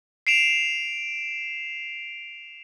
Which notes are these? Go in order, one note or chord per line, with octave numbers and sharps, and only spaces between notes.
C7 D7 E7 F7